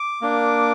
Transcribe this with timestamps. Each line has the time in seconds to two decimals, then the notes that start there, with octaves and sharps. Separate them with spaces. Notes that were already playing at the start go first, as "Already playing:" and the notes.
Already playing: D6
0.21 A#3 D4